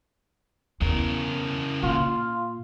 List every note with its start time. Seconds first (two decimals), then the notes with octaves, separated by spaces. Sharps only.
0.81 E2 C#3 A#4
1.83 A#2 F4